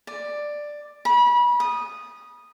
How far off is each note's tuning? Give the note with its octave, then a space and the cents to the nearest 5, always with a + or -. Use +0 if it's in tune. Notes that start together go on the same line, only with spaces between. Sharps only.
D5 +10
B5 -30
D#6 -10